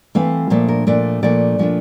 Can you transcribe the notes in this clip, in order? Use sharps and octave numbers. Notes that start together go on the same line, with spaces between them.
E3 A3 C4 F5
A#2 F3 A3 D4 F5
A#4
A#2 F3 A3 D4 D5
A#2 F3 A3 D4 D5
A#2 F3 A3 D4